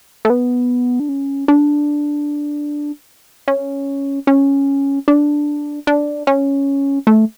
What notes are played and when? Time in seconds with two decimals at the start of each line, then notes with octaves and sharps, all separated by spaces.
0.25 A3
0.30 B3
1.00 D4
1.09 C#4
1.48 D4
3.48 C#4
4.27 C#4
5.08 D4
5.87 D4
6.27 C#4
7.07 A3